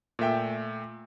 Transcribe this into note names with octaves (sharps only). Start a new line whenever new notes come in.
A#2 A3 E5 G5